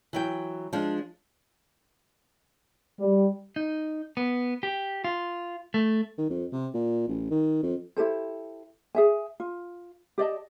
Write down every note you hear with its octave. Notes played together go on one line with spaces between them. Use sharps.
E3 F#3 G5
F3 G#3 D4
G3
D#4
B3
G4
F4
A3
D#3
F2
C3
A#2
A1
D#3
F2
E4 G4 A4 C5
G#4 E5 G#5
F4
G4 D5 D#5 A5